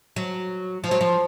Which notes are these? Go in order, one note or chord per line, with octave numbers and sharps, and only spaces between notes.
F#3
F3
F#3
F3